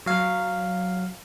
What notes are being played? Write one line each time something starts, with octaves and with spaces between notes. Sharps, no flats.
F#3 F5